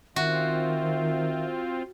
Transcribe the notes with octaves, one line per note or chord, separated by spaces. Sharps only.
D#3 C4 F4 F#4 E5